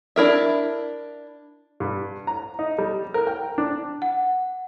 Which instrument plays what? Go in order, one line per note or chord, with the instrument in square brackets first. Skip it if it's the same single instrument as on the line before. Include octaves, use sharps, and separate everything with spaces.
[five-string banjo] D4 E4 A#4 E5
[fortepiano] G2
A#5
D#4
G3
A#4
G5
D4
[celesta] F#5